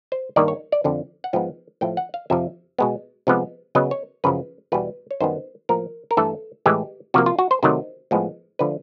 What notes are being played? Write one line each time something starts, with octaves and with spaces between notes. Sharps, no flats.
C5
G2 D#3 G3 A#3 D5
C#5
D5
F2 D3 F3
F#5
G#2 F3 G#3 B3 G5
A2 F3 A3 G5
F#5
F5
F2 C3 F3 E5
B2 G#3 B3
C3 F3 G#3 B3
C#3 F#3 B3 D#5
C#5
F#2 C#3 F3 B4
E2 B2 G3 B3 B4
C#5
F#2 D#3 G3 B3 C5
A2 F3 A#3 A#4
A#4
G2 E3 A3 A4
A2 E3 G#3 G4
C3 F3 A#3 F#4
F4
F#4
C5
C3 D#3 F#3 A3 C5
A2 F3 G#3 B3
D3 F3 A3 B4